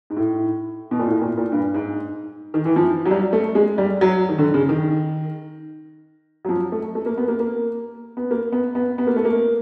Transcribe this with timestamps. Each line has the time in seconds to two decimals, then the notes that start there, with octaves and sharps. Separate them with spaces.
0.10 G#2
0.17 A2
0.91 B2
0.99 A#2
1.07 A2
1.22 A#2
1.37 A#2
1.52 G2
1.74 G#2
2.54 D#3
2.65 E3
2.76 F3
3.05 F#3
3.11 G3
3.33 A3
3.55 G#3
3.78 G3
4.01 F#3
4.29 D#3
4.38 D3
4.54 C#3
4.69 D#3
6.45 F#3
6.49 F3
6.72 A3
6.95 A3
7.06 A#3
7.18 B3
7.28 A#3
7.40 A#3
8.17 B3
8.31 A#3
8.52 B3
8.75 B3
8.98 B3
9.07 A#3
9.16 A3
9.25 A#3